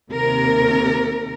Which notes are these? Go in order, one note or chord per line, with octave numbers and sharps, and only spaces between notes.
D#2 C3 A#4